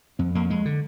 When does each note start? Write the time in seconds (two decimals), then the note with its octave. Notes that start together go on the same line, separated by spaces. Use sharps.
0.19 F2 C4
0.35 F2 A#3
0.50 F2 G#3
0.65 D3